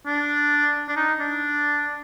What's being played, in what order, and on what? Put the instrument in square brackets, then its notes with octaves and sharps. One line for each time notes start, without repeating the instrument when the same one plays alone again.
[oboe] D4
D4
D#4
D4